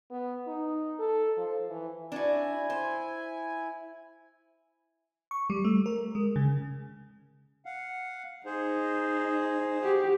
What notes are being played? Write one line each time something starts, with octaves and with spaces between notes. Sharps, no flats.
B3
D#4
A4
F3
E3
D4 E4 F#4 G#5
C5
C#6
G3
A3
A#4
G#3
C#3
F5 F#5
D#4 G#4 C5
F#4 G4